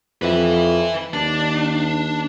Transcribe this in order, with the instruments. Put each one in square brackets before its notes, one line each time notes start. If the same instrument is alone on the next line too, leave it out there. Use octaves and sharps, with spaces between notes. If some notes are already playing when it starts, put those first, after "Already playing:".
[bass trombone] F2 [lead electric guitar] B4 E5
[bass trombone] D#2 [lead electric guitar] D4